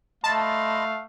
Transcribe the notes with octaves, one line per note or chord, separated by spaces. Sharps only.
A3 D#5 F5 A5 B5 C6